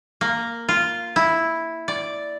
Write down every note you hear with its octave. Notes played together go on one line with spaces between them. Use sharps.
A#3
F4
E4
D5